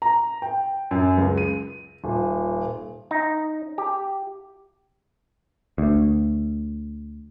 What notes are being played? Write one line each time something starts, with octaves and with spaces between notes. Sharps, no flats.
A#5
G5
F#2
C#2
D#7
D#1
D#4
G4
D2